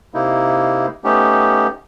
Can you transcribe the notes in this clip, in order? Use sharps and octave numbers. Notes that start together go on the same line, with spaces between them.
C3 A#3 D#4 E4
A3 B3 C#4 D#4 G4